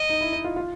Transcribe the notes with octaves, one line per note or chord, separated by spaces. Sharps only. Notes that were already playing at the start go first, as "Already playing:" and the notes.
Already playing: D#5
D#4
E4
D#4
F4
F4